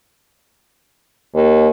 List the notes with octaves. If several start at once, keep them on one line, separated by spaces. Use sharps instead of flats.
D#2